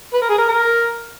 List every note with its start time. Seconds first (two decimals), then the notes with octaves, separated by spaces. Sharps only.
0.13 B4
0.22 A#4
0.29 G#4
0.38 A#4
0.49 A#4